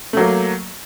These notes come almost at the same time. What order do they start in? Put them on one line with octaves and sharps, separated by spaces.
A3 F#3 A#3